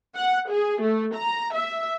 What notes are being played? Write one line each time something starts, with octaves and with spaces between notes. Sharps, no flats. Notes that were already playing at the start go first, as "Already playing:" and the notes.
F#5
G#4
A3
A#5
E5